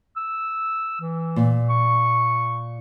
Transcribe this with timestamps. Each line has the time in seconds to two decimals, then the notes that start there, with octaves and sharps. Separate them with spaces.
0.17 E6
1.01 E3
1.36 A#2
1.70 C#6